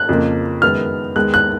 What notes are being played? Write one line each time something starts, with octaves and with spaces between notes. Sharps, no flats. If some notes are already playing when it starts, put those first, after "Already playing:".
Already playing: F#6
F2 C#3 F3 A#3
F#2 D#3 G#3 B3 F6
D#2 D#3 G#3 B3 F#6
F#6